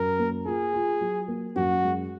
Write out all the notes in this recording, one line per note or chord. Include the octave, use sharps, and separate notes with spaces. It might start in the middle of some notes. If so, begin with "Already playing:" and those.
Already playing: F#2 A#4
A#3
F4 G#4
F4
F#3
A#3
F#2 F#4
G#3